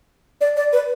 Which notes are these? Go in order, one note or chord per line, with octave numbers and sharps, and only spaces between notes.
D5
D5
B4